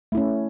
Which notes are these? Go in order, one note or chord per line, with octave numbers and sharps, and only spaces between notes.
A3 C#4 E4